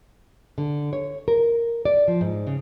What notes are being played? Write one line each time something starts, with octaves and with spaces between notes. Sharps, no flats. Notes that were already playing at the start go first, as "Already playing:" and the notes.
D3
C#5
A#4
D5
F3
G#2
C#3